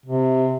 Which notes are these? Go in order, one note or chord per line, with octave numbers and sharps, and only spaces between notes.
C3